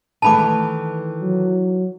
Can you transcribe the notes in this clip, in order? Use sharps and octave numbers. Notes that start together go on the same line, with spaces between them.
D#3 E3 A3 A5 B5 D6
F#3